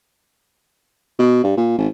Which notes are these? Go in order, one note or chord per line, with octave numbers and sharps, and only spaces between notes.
B2
G2
A#2
G#1